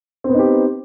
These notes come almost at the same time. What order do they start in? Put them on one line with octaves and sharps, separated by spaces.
C4 B3 D#4 G4